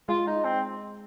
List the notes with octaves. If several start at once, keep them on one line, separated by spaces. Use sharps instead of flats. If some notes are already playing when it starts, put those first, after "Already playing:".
G#3 F4
D#4
C4